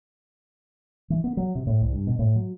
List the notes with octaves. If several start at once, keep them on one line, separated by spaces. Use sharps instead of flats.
E3
B3
F#3
C3
A2
C2
G2
B2
A2
F#3